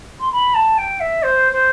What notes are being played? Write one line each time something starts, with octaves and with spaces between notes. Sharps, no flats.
C6
B5
A5
G5
E5
C5
C5